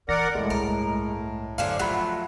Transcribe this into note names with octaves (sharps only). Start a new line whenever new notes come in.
E3 A#4 D5 F#5 A#6
E1 E2 A2 G#3 A3
C2 G2 A#4
F#2 D3 G#4 C5 F5
D#3 F3 F#3 A3 F4 F#5 B5